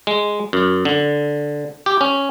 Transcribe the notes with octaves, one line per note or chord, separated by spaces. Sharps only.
G#3
F#2
D3
G4
C#4